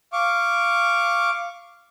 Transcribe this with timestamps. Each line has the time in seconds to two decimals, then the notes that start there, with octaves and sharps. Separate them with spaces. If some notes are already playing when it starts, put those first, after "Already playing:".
0.13 F5 C#6 D6